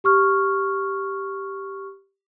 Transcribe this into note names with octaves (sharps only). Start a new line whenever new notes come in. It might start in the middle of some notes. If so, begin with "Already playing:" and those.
G4 C#6 F6